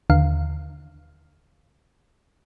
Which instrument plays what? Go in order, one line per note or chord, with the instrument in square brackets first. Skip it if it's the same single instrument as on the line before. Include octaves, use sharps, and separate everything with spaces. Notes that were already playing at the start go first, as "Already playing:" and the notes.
[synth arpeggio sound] D#2 D3 F5